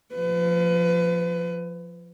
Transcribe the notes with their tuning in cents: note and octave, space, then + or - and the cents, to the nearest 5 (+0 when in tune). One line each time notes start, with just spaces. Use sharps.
F3 +0 B4 +30